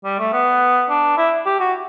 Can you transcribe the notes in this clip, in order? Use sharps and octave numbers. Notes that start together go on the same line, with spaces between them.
G3
A3
B3
D4
E4
G4
F#4